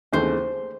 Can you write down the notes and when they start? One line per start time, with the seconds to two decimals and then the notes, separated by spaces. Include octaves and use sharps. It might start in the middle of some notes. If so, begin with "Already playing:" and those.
0.13 D#2 C#3 E3 A3 C4 C5